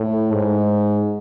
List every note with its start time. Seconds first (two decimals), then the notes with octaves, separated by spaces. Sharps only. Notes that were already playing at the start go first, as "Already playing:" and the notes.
Already playing: A2
0.31 G#2